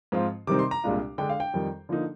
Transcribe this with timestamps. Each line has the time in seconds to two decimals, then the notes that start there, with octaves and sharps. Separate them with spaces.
0.12 G#2 F3 C4 F4
0.47 C3 D#3 G3 C4 D#4 D6
0.59 C6
0.71 A#5
0.84 C2 A#2 G#3 D4 F4
1.18 D3 G#3 D4 G5
1.29 F5
1.40 G5
1.54 F2 D#3 G3
1.89 D3 F3 A#3 D#4